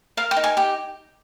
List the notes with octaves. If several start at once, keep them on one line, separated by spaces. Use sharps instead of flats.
A#4 F5
G5
D#4
G#5
G4 G5